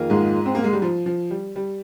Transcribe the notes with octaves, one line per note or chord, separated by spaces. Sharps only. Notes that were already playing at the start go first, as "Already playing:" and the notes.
Already playing: F2 D#3 A#3 F4 G#4
G#2 G#3
C4
A#3
G#3
G3
F3
F3
G3
G3